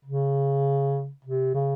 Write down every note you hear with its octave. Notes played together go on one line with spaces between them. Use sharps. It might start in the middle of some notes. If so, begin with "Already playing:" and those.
C#3
C3
C#3